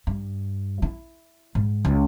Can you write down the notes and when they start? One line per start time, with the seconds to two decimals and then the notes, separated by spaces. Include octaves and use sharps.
0.07 G2
0.82 E4
1.55 G#2
1.85 C#2